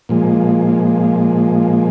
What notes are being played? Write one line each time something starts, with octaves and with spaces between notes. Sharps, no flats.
A#2 F3 G#3